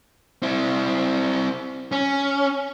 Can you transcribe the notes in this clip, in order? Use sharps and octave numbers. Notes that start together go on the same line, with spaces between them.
C4 E4
C#4